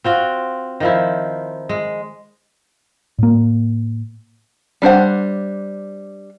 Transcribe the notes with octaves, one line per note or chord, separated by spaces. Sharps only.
C4 F4 F#4
D#3 F3 E4
G#3
A2 A#3
G3 D4 C5 F#5